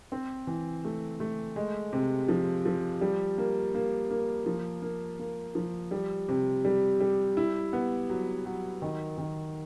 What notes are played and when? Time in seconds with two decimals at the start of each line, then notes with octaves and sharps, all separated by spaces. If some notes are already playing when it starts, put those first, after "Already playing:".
0.12 C4
0.47 E3
0.85 A3
1.20 A3
1.56 G#3
1.93 C3
2.29 F3
2.65 F3
3.01 G3
3.38 A#3
3.74 A#3
4.10 A#3
4.46 F3
4.82 A#3
5.19 A#3
5.55 F3
5.91 G3
6.29 C3
6.65 G3
7.00 G3
7.37 E4
7.73 B3
8.09 F#3
8.46 F#3
8.82 D#3
9.18 D#3